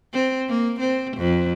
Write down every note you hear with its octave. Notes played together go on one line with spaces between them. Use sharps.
C4
A#3
C4
F2